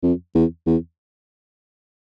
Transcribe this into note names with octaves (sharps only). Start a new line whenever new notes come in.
F2
E2
E2